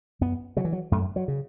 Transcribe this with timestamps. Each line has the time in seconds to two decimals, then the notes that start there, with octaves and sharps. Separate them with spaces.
0.21 F#2 B3
0.57 C#3 F#3
0.65 E3
0.73 F#3
0.91 F#2 A3
1.16 F#3
1.28 C#3